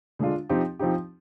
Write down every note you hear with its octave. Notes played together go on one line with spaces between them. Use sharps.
D3 G#3 D4 F4
F3 C4 D#4 G4
F3 C4 D#4 G4